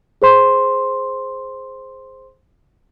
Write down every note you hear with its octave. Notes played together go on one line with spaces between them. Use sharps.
G#4 C5 C6